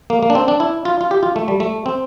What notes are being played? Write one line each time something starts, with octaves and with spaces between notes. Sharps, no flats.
A#3
A#3
D4
C4
D4
E4
F4
F4
G4
F4
A3
G3
A3
C4